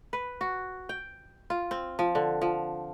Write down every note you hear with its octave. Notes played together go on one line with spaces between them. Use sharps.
B4
F#4
G5
F4
C4
F3
D3
F3